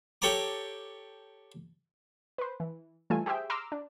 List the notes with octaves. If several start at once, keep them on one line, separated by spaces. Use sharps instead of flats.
G4 A4 C#5 A5 A#5 D6
B4 C5
E3
E3 G3 A3 F4 A4 G#5
G4 G#4 C5 E5 G5
A#5 C6 D6 E6 F6
D4